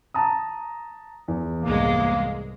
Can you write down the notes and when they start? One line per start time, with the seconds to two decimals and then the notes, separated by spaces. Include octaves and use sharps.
0.14 A5 A#5 D#6
1.28 E2
1.63 C2 G#2 G#3 A#3